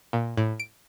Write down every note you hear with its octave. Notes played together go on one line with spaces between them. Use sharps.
A#2
A2
D7